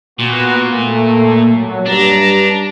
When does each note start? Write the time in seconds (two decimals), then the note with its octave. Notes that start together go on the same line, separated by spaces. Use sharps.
0.19 A#2 B3 F#4
0.73 A3 A#3
1.49 F#3
1.86 G2 D4 A#5